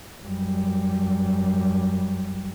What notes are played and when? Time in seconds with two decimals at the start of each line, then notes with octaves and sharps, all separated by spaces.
0.24 F#2 G3